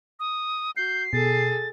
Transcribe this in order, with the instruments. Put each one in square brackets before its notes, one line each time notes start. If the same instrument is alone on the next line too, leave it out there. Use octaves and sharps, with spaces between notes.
[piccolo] D#6
[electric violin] F#4 [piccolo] G6 [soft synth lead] C7
[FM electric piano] B2 [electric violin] G#4 A4 [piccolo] A6